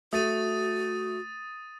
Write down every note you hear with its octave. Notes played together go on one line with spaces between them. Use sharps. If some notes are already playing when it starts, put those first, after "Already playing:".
A3 F#4 D#6 A6 D#7